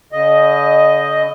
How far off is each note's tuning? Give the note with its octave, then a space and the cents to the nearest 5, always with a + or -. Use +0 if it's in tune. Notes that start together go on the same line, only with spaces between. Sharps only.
D3 -45 D#5 +0